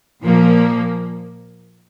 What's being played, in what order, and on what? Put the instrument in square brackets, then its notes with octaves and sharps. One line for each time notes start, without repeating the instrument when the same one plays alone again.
[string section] A#2 F3 A#3